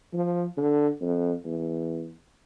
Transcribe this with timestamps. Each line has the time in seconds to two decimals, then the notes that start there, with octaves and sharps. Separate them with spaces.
0.13 F3
0.57 D3
1.01 F2
1.45 E2